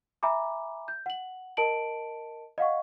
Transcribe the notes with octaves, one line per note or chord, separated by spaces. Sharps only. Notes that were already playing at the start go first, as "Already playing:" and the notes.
E5 G#5 A#5 B5 D6
G6
F#5 F#7
A#4 D#5 A5 D7 F#7
D#5 F5 F#5 C#6